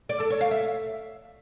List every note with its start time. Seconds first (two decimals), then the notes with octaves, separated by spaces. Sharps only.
0.09 D5
0.20 A4
0.30 C#5
0.41 F5
0.51 E5